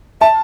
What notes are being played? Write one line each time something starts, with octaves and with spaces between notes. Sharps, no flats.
E5 A5